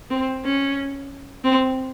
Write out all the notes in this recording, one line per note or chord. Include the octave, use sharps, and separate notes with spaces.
C4
C#4
C4